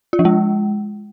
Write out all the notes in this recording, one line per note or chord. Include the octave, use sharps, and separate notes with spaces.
F4
F3
G#3